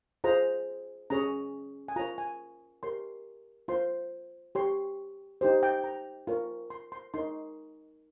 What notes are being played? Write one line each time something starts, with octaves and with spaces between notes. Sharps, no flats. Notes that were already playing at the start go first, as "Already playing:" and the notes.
F4 G#4 C5 A#5
C#4 G#4 C#5 A#5
G#5
F4 A#4 C#5 A#5
G#5
G4 A#4 C#5 C6
F4 C5 C6
G4 C#5 C6
D#4 G4 C5
G5
A#5
F4 A#4 C#5
C6
C6
D#4 A#4 C#5 C6